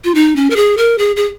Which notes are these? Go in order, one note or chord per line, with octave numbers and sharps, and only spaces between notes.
F4
D#4
C#4
A#4
G#4
A#4
G#4
G#4